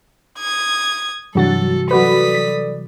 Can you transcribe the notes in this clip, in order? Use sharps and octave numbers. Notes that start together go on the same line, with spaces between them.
D#6 G#6
G2 C3 E3 F#3 G3 F#4 A4 A6
F#3 F#4 A4 B4 D5 D#6 B6